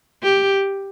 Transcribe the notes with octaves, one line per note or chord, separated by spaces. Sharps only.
G4